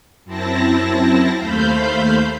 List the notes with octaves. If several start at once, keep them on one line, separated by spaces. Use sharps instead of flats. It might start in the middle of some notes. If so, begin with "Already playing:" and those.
F#2 C4 E4 A5 A#6
D#2 A3 C5 F5 B5 G6